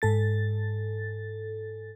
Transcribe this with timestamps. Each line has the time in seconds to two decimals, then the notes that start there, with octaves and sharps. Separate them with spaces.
0.02 G#2 A4 A6